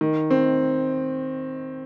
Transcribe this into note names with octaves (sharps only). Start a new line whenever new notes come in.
D#3
C4